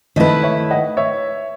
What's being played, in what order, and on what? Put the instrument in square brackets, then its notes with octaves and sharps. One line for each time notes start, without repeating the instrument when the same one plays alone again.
[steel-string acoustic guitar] D#3 A3 E4 B4 [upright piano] D#5
[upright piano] C#5 E5
D#5 F#5
C#5 E5